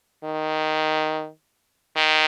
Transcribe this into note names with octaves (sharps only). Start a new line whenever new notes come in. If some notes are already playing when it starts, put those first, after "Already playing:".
D#3
D#3